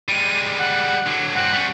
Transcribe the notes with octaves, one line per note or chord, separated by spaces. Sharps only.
G3 G#3 D#7
F#5
D3 F#3
G2 C4 F#5
G3 C#4